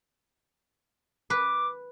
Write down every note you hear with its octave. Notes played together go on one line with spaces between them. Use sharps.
B4 D6